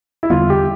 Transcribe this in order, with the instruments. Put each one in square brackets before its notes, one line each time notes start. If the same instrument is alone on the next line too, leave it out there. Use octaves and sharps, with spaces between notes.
[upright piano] E4
[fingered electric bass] E2 D3 G3 B3 [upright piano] F4
[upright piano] G4